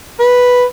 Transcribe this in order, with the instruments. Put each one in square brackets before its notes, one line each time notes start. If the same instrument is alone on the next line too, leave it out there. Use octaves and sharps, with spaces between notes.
[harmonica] B4